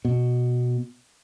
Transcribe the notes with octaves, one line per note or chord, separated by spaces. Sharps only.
B2